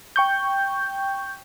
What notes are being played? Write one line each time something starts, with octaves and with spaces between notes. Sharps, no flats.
G5 C#6 G6